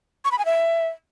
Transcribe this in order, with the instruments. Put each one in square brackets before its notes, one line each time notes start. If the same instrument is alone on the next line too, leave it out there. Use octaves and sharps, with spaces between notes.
[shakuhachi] C#6
B5
G#5
E5